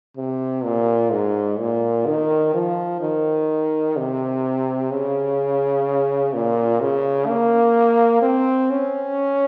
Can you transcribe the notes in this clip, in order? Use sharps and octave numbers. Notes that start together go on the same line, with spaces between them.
C3
A#2
G#2
A#2
D#3
F3
D#3
C3
C#3
A#2
C#3
A#3
C4
C#4